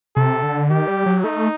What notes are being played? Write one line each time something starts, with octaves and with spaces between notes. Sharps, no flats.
C3 A4
D3
D#3 G4
G3
F#3
A3 D#4